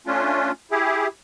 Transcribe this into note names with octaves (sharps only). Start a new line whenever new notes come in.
A3 C#4 D4 F4
E4 G4 G#4